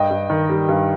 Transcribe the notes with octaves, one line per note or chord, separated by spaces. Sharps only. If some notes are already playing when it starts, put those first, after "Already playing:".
Already playing: G2 D#5 G5
G2
D#3
G3
G2